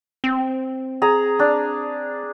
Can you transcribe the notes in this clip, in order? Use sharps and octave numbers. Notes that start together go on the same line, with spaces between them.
C4
G#4 A#5
D4